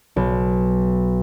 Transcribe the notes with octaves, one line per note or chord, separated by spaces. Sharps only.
B1